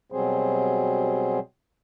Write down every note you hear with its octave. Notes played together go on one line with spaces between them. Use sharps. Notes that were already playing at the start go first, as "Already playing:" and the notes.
B2 F#3 G3 C4 G#4 C5